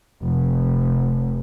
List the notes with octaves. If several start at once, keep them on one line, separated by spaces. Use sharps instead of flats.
F1